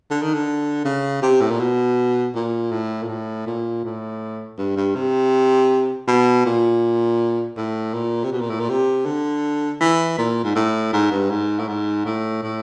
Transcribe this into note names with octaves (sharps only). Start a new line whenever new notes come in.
D3
D#3
D3
C#3
C3
A2
A#2
B2
A#2
A2
A#2
A2
A#2
A2
G2
G2
C3
B2
A#2
A2
A#2
C3
B2
A#2
A2
A#2
C3
D3
E3
A#2
G#2
A2
G#2
G2
G#2
A2
G#2
A2
A2